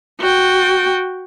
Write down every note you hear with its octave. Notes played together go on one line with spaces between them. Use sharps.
F#4 G5